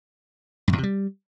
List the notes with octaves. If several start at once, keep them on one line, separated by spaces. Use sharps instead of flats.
G2
E2
C3
G3